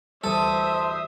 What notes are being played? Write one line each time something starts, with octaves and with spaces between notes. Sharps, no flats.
D2 E3 G3 A4 C5 E5 D#6